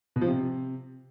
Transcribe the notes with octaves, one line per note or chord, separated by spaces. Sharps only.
B2
F3
C3